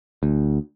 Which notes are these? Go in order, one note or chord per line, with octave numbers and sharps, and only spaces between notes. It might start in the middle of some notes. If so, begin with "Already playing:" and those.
D2